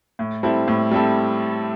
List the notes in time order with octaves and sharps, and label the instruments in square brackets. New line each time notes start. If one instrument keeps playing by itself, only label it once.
[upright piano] A2
G3 C4 E4 A4
A2
G3 C4 E4 A4